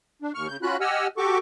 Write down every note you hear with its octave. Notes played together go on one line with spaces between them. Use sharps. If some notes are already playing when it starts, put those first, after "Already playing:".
D4
D#2 C#6 F6
C#3 G6
C#4 F4 F#4 B5 F#6
G4 D#5 F#5 G#5 E6 F6
F#4 G4 A4 C#6 D6